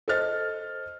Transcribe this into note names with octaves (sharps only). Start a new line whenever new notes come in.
A4 C5 D#5 F6 A6